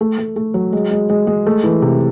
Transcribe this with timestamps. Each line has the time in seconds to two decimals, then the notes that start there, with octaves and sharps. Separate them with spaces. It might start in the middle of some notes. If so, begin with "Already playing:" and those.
0.01 A3
0.18 A3
0.36 A3
0.54 F#3
0.73 G#3
0.91 G#3
1.10 G#3
1.27 G#3
1.46 A3
1.63 E3
1.82 C3